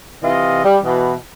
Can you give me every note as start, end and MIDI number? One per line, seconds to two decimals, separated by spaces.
0.23 0.64 48
0.23 0.64 52
0.23 0.64 65
0.23 0.64 75
0.64 0.78 55
0.83 1.15 47
0.83 1.15 52